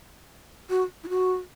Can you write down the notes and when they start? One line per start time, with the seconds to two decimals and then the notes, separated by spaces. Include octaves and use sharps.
0.70 F#4
1.04 E4
1.09 F#4